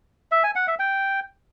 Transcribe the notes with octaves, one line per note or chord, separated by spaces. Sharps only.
E5
G#5
F#5
E5
G5